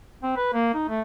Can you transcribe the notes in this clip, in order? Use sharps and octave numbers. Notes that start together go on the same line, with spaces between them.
C4
B4
A#3
D#4
A3